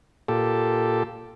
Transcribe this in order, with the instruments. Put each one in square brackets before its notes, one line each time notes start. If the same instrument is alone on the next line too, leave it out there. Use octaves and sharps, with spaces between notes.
[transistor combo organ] A#2 G4 A4